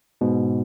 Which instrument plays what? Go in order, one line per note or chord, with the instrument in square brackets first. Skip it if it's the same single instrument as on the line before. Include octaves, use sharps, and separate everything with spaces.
[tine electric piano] G#2 B2